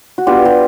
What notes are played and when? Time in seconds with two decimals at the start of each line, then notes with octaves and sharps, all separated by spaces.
0.18 F#4
0.26 G3 B3 D4 F4 G4
0.45 G4